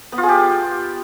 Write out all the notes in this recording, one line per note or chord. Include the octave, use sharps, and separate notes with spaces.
B3
F4
G#4
G4